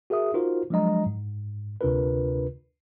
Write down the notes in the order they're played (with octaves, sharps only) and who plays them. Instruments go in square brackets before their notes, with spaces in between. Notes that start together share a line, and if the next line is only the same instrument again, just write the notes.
[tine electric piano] F#4 G#4 A#4 E5 D#6
D#4 F4 F#4 A#4 C5
F3 F#3 G#3 D4 D#5 A#5
G#2
D2 C3 D4 F4 A#4 B4